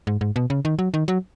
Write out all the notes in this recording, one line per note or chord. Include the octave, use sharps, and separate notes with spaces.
G#2
G#2
B2
C#3
D#3
F#3
D#3
F#3